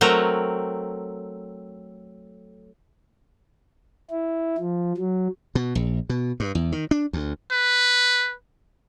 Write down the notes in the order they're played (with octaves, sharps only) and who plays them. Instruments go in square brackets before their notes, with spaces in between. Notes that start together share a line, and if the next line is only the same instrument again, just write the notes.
[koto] F#3 A3 C4 A#4
[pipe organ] E4
F3
F#3
[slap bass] B2
A#1
B2
G2
E2
D#3
D4
D2
[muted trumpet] B4